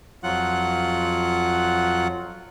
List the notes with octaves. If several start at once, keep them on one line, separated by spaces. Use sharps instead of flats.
F2 F#3 F4 F#5 F#6